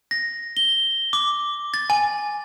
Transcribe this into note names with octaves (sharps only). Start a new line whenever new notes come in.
A#6
G7
D6
A6
G#5